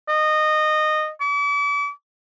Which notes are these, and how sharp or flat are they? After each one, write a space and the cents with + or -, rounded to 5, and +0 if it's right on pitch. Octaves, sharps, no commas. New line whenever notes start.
D#5 -15
D6 -40